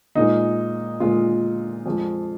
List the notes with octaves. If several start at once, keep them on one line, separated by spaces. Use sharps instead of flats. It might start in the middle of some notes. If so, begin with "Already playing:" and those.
A#2 G#3 D#4
A#2 G#3 F4
F2 F3 G#3